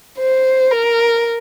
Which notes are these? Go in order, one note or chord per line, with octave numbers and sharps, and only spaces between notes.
C5
A#4